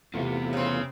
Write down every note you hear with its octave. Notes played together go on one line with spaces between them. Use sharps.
E2 C3 E3 A3 B3 F4
C#3 C4